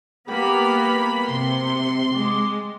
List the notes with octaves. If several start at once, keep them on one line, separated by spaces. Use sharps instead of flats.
A#3 B3 G4 B5
C3 C6
G#3 D5